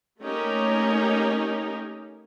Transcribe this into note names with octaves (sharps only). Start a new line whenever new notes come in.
A3 A#3 C#4 D#4 G4 A#4